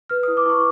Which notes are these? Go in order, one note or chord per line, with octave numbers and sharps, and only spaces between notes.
B4 F6
D#6
E4
D6
E4 C#6